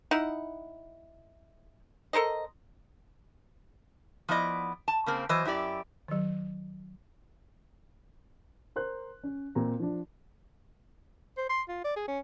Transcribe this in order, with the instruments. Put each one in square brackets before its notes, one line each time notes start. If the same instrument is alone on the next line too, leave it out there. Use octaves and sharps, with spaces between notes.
[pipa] D#4 E4 F#5
A4 A#4 C5 D#5
[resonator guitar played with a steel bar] F3 B3 E4 D5 D#5
A5
C#3 A#3 C4
E3 F#3 C5 D#5
F#2 E4 G4 D5
[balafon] D#3 F#3
[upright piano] A#4 C5 F#6
C#4
A#2 C4 A#5
F3 D4
[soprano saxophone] C5
C6
F4
D5
G#4
C#4